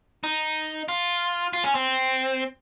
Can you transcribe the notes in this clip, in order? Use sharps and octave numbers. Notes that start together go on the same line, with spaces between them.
D#4
F4
F4
C#4
C4